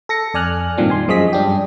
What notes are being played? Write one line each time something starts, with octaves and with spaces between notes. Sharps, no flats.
A4 A#6 C#7
F2 D5 G#5 F6 F#6
G2 A#2 D#3 F3 C4 D4
G#5 C6
F#2 F3 G#3 D#5 B6
G2 D4 G4